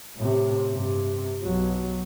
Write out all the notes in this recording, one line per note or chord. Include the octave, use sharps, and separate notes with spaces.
A2 C3
G2 C3
B1 F#3